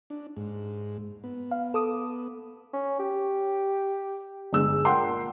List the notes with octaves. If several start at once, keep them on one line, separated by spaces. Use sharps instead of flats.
D4
G#2
B3
F5
A4 D6 D#6
C#4
G4
G1 G#3 E6
A#2 F#5 G5 C6